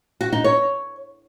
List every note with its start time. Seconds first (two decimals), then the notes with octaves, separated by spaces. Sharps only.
0.21 F#4
0.32 D#4
0.44 C#5